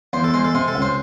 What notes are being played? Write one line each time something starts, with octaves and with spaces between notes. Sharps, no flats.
E2 C5
A4
G#3 C5
A4
C3 C5
A4
C#2
C5